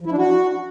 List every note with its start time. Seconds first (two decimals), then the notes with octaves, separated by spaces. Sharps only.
0.01 F3
0.06 E4
0.12 D4
0.18 F#4